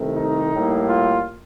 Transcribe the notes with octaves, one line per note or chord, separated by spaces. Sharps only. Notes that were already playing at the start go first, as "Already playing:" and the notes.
Already playing: C2 C3 D#3 A3
D#4
A2 G3 A#3
F4